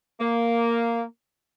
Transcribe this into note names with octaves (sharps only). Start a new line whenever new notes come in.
A#3